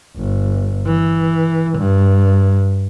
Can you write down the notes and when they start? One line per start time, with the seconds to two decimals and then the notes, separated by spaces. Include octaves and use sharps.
0.17 G1
0.86 E3
1.78 G2